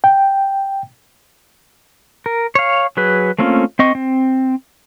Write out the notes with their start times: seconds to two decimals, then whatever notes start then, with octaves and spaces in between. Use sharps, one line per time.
0.04 G5
2.26 A#4
2.55 C#5 F5
2.97 F#3 G#4 B4
3.38 A3 A#3 C4 C#4 F4
3.79 C4 D#5 C#6
3.95 C4